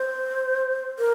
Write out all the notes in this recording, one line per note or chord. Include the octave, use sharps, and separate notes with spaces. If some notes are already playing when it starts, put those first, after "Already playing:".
Already playing: C5
A#4